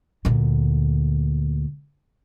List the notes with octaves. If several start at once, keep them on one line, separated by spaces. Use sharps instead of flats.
D2 A#2